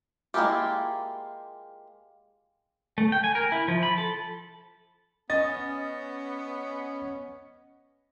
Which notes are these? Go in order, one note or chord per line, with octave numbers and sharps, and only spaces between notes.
G#3 A#3 E4 F4 G4
A3
G5
G#5
A#4
E4
F3
B5
A4
B3 C#4 D#5 A6